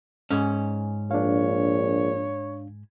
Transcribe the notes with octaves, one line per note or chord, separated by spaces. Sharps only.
G#2 C#4
A#1 D4 C#5 F5